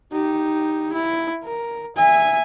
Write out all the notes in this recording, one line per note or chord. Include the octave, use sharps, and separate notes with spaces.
D#4 G4
E4
A#4
E5 G#5